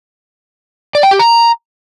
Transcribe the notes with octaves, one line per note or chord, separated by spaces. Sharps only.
D5
G5
G4
A#5